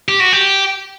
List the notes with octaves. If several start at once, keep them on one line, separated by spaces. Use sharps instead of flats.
G4
F#4
G4